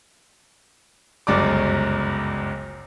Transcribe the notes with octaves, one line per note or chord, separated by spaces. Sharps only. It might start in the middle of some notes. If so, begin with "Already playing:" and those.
G1 C#2 F#2 D5 D6